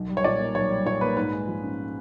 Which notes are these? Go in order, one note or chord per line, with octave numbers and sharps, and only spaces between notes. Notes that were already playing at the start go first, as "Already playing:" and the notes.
Already playing: B1
G3
C#5
A#2 D5
A#3
B1 C#5
G3
A#2 C#5
A#3 B4
G#2 B4
G#3
F3
C#4